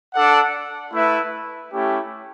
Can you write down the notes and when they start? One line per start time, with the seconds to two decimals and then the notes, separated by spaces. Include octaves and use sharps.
0.15 D4 A4 D5 F#5
0.93 A3 E4 B4 E5
1.72 A3 C#4 E4 G4